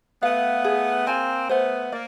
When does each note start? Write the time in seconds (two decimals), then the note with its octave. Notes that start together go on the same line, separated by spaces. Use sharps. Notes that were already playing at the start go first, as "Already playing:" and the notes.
0.23 A3 B3 F5
0.64 G#4
1.07 A#3 C4 G#5
1.49 A3 B3 C5
1.92 A#3 D5